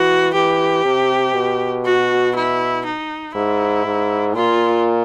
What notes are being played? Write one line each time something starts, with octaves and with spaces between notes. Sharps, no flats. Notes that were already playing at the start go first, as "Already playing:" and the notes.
Already playing: E3 F#4
E3 G4
C3
B2
F#4
E4
D#4
G#2 E4
G#2
A#2 F4